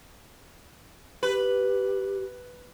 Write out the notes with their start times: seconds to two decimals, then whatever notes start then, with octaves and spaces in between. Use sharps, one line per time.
1.23 G4 B4